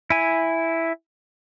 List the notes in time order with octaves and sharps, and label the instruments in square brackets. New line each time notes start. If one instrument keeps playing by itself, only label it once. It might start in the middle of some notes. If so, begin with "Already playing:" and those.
[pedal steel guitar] E4 G#5